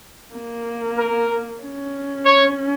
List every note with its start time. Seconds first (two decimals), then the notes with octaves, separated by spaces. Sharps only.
0.34 A#3
0.98 A#4
1.62 C#4
2.25 C#5